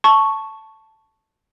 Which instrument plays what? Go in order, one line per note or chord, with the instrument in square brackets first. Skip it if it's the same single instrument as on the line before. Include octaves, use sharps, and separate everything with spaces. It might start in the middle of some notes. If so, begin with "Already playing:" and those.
[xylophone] A5 C#6